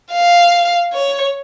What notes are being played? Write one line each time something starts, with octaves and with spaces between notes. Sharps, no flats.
F5
C#5